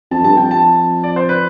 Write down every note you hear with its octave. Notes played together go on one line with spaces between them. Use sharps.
F2 A5
G2 A5
F2 G5
A5
D5
C5
B4